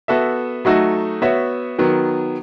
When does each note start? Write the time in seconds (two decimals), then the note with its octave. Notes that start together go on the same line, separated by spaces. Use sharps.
0.08 B3 F#4 A4 E5
0.65 F#3 A3 D#4 F#4 A4
1.22 B3 F#4 C#5 E5
1.79 D#3 F#3 B3